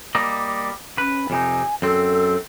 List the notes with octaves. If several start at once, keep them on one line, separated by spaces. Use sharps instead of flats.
G3 A#3 D#5
C#4 B4
F2 C3 D#4 G#5
F#2 C4 A4